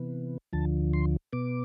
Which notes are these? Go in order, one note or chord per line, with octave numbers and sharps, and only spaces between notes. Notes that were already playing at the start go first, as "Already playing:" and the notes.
Already playing: C3 E3 B3
D2 D3 F3 A5
C6
B2 B3 D6